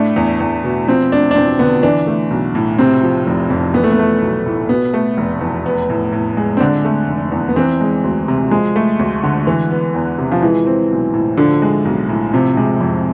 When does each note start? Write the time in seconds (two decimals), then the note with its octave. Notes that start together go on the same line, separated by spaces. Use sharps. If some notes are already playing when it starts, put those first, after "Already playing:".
Already playing: A2 A3 D4
0.16 E2
0.40 E2
0.64 B2
0.88 F3 C4
1.12 A3 D4
1.31 D4
1.35 E2 C4
1.59 D3 B3
1.83 E3 D4
2.07 A3
2.31 B1
2.55 A2
2.78 C3 C4
3.03 F3
3.27 F1
3.50 F2
3.74 E3 B3
3.84 A3
3.92 B3
3.99 A3
4.22 B1
4.46 A2
4.69 B2 B3
4.94 A3
5.17 F1
5.41 E2
5.66 B3
5.90 A2
6.12 A2
6.37 G#3
6.57 C4
6.60 D3 D4
6.85 A3
7.08 F1
7.32 E2
7.49 B3
7.56 E3 C4
7.81 G#3
8.04 D2
8.28 C3
8.51 F3 G#3
8.76 A3
8.99 D2
9.23 D3
9.47 E3
9.70 B3
9.94 E2
10.18 C3
10.32 F3
10.42 E3 G#3
10.67 C4
10.91 B1
11.14 A2
11.37 D3 F3
11.62 G#3
11.85 B1
12.09 A2
12.34 C3 F3
12.57 C3 G#3
12.81 F2